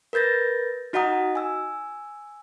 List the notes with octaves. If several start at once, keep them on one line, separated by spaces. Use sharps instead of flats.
A#4 B4 G6 A6 A#6
D#4 F#4 D#5 F#5 A#5 D#6
G#5 E6